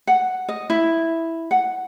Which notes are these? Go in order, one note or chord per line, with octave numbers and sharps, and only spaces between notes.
F#5
D#5
E4
F#5